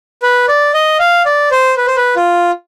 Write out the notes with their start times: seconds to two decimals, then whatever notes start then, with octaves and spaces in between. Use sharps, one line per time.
0.22 B4
0.48 D5
0.74 D#5
0.99 F5
1.26 D5
1.51 C5
1.77 B4
1.87 C5
1.97 B4
2.16 F4